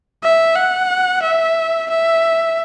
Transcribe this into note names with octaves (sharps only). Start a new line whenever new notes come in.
E5
F#5
E5
E5